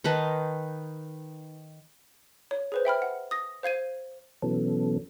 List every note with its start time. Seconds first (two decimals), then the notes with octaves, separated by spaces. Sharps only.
0.04 D#3 D#4 B4 A5
2.51 C#5
2.72 G#4 B4 C5
2.85 E5 G5 B5 F6
3.02 F#5
3.31 D#6 A#6
3.63 C5 F5 G#6 D#7
4.42 B2 E3 F#3 B3 C#4 A4